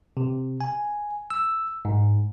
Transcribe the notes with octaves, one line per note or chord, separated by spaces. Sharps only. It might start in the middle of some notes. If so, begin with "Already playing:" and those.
C3
G#5
E6
G#2